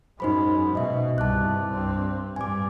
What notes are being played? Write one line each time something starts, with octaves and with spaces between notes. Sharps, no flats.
F#2 G#3 D#4 C5 B5
B2 D#5 E5
C2 G2 A5 D6 F#6
G2 C4
G2 G#5 D6